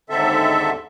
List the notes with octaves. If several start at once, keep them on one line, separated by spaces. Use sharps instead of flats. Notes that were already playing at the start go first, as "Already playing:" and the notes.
D#2 G#2 D3 C4 A4 E5